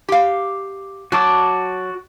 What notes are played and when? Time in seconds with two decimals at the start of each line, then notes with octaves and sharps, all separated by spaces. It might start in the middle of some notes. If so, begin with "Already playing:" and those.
0.09 G4 F5
1.12 F#3 F#4 A5 D6